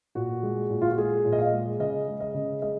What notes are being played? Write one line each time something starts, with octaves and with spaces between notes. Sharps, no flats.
A#2 F#4
G#3
A#2
F4
F#4
G#3 G#4
A#2
D#5
F5
G#3
C#3 D#5
G#3
D#5
C#3
G#3 D#5